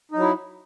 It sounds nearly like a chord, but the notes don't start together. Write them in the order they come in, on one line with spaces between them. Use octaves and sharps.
D#4 F#3 E4